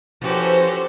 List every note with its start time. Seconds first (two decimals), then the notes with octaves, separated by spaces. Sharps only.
0.22 E3 F3 C#4 F#4 G4 A4 C5